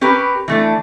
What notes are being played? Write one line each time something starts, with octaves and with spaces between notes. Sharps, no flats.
C#4 G4 A#4 B4
E3 A3 D4